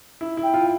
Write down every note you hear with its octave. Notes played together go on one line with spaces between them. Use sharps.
E4
E4
G5
F4